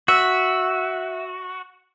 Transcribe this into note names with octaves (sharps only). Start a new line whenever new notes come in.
F#4 E5